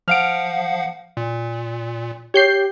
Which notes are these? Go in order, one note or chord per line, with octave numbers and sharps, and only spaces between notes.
F3 F5 F#5 F6 D7
A#2
G4 C#5 G6 C7